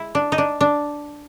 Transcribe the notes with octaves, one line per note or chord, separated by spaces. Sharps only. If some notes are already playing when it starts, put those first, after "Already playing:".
Already playing: G#3 E4
D4
D#4
D4
D4